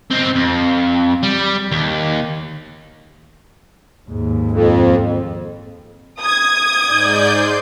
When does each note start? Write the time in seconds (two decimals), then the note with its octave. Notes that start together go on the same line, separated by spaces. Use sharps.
0.11 C4 D#4
0.36 F2
1.23 G3
1.72 D#2
4.10 D#2 G#2
4.51 F2
6.20 D#6 G#6
6.83 G#2 D5 G6
7.29 C6